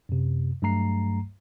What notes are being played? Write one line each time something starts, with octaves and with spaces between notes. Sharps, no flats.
F#2 C3
G2 F#3 A3 A#5 C7